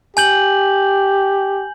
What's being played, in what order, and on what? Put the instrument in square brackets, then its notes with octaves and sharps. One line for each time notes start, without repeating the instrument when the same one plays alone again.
[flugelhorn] G4 [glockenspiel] G#5 G6 F#7